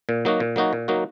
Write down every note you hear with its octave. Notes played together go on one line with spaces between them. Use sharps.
A#2
F#3 A#3 D#4 F#4
A#2
F#3 A#3 D#4 F#4
A#2
F#3 A#3 D#4 F#4